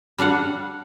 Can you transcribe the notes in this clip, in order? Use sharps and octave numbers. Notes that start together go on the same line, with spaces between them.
G3 D4 F5 F#5